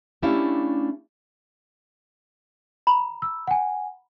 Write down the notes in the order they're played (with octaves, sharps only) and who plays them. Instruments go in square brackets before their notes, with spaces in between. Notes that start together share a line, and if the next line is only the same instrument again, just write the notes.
[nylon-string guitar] A3 C#4 D4 E4 G4 F5
[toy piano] A#5 B5
[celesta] E6
F#5 G#5